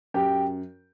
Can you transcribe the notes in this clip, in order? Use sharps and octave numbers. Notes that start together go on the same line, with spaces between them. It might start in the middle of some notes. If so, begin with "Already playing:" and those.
F#2 G4 G5